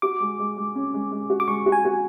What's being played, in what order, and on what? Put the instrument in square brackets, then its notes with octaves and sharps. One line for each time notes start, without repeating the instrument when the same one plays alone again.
[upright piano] F#4 [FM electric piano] D6
[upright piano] G#3
G#3
G#3
C#4
G#3
G#3
F#4
[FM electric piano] D6
[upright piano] G#3 [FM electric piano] C#6
[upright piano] F#4
[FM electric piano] G#5
[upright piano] F#4